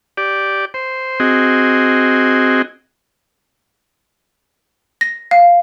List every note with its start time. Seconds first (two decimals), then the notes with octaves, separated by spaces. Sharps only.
0.17 G4 D5
0.74 C5
1.20 C4 F#4 G#4 D#5
5.01 A#6
5.31 F5